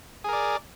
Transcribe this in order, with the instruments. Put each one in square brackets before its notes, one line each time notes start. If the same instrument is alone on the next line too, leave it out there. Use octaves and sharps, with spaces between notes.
[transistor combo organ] G#4
A#4
D5